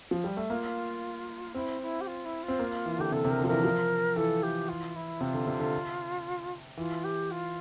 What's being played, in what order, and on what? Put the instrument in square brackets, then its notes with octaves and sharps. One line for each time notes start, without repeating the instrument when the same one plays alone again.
[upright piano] F3
G3
A3
[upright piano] A#3 [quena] F4
[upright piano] C4 [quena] E4
[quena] E4
G4
F4
E4
F4
[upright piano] C4
A#3
E3
[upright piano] D3 [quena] G4
[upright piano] C3 [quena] A4
[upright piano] C3
[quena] A#4
[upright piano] D3
F3
[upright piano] E3 [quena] A#4
[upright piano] F3
[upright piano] E3 [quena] A4
[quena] G4
F4
E4
[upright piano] C3 [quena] F4
[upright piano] D3
C3
D3
[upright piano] E3 [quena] F4
[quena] G4
F4